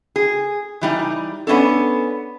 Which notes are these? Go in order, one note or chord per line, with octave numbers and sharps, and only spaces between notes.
G#4
E3 G3 D#4
B3 C#4 D4 A4